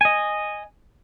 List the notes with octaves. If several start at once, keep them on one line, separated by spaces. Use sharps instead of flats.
D#5 G#5